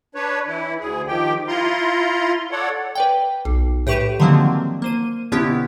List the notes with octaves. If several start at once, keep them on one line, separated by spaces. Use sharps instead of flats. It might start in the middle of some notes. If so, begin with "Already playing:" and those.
D4 B4 C#5
E3 E4
D2 G#4
D#3 F3 G4 G5
E4 F4 A#5 C6
A4 C#5 D5 F#5
B4 D5 G5
B1
A2 G4 B4 C#6 D7 E7
D3 D#3 F3 F#3 A#3 C4
A#3 C5 D#7
B2 D3 B3 C#4 E4 G4